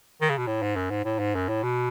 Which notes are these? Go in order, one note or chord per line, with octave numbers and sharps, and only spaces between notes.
D#3
C#3
B2
A2
G#2
F#2
G#2
A2
G#2
F#2
A2
B2